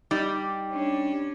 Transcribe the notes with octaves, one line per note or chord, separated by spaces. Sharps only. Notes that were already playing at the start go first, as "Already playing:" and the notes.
G3 D#4 D6
C#4 D4